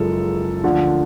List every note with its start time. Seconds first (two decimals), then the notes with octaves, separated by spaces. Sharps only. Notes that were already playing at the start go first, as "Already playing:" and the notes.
Already playing: F#1 F#2 F3 G#3 A4
0.64 D2 D3 F3